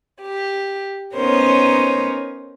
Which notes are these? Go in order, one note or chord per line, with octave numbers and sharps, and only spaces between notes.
G4
B3 C#4 D#4 A#4 C5 C#5